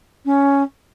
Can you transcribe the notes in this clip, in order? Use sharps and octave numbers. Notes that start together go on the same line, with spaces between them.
C#4